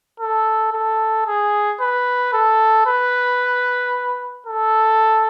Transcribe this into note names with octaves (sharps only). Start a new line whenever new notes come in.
A4
A4
G#4
B4
A4
B4
A4